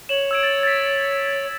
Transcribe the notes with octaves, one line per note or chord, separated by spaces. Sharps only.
C#5 E7 F#7
E6 G#6 D7
A6
A6 B6